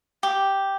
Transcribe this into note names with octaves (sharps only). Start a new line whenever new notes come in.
G4